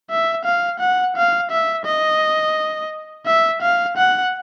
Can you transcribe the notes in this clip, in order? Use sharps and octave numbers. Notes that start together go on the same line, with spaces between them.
E5
F5
F#5
F5
E5
D#5
E5
F5
F#5